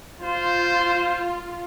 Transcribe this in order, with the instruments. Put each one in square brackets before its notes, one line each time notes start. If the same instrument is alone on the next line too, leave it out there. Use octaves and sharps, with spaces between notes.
[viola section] F4 [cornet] C5